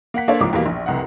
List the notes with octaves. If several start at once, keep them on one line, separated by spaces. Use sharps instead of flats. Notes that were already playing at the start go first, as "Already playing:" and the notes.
A#3 F#5 B6
A#3 D4 A4 C5 C#5
C2 G#2 F3 D6
E2 B2 G3 A#3
A#1
F1 C2 F#5